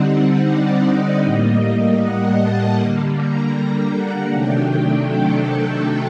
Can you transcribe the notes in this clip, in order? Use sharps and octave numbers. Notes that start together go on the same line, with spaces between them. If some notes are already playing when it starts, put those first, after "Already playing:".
Already playing: D3 G3 C4 D#4 F#5
D5
D#5
A2 G3 A#3 D#5
F#5
A5
D3 G3 A#3
A#5
F#5
C3 D#3 F#3 A3 D4 G5
A4